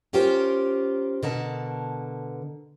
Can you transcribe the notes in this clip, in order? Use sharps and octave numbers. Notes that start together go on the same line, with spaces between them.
C#4 F4 G4 A#4 C5
B2 D3 A#4 A5